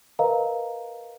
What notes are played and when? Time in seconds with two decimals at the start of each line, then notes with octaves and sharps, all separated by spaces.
0.19 A#4 B4 D#5 F5 A#5